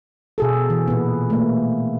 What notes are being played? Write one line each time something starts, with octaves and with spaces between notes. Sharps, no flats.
B2 G#4 A4
E3
A#2 B3
A3 A#3